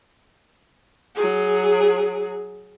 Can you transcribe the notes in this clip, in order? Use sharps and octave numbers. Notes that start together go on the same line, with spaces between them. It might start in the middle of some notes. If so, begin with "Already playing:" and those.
F#3 G#4